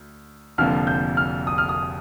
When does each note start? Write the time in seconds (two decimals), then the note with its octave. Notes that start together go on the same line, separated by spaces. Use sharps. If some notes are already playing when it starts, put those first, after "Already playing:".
Already playing: D2
0.58 F1 F2 D3 F3 A#3 F6
0.87 G6
1.17 F6
1.47 D#6
1.58 F6
1.69 D#6